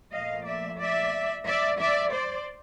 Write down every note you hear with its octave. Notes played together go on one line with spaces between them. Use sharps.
A#2 F3 A3 D#5 F5
D5 E5
D5 E5
D5 E5
D5 E5
C5 D5